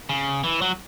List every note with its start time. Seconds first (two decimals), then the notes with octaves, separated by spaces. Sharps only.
0.09 C#3
0.44 E3
0.61 F#3